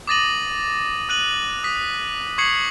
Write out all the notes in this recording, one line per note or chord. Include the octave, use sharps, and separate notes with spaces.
D6 D#6 A6 A#6 D#7 F#7
D#6 F#6 D#7 F#7
D#6 B6
C#6 D#6 G#6 C7 C#7 F#7